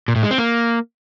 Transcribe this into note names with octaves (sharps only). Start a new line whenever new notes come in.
A#2
A2
G#3
C4
A#3